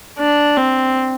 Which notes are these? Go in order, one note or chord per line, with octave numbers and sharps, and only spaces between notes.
D4
C4